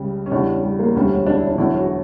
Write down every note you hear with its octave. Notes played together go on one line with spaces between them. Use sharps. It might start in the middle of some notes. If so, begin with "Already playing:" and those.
Already playing: C#2 C#3 G3
C#4
E2 C#3 G3 D4
C#4
G3
A#3
E1 D2 D3 G3 C#4
D4
E4
D4
E1 E2 D3 F#3 E4
E4
F#4